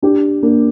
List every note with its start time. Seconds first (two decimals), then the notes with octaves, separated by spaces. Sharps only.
0.02 D4 G4
0.43 A#3 D4